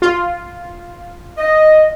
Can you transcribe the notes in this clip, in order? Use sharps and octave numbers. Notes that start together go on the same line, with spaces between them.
F4
D#5